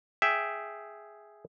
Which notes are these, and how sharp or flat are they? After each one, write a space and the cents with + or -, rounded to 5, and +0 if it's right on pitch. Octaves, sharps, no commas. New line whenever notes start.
G#4 +0 E5 +0 G5 +0